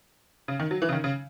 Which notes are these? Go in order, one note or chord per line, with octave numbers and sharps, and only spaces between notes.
C#3
D#3
F#3
E3
C#3
D#3
C#3